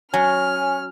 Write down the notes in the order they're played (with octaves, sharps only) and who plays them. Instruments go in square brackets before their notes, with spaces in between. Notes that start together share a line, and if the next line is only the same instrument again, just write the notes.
[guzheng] F#3 [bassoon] C#4 [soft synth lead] G#5 [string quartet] F6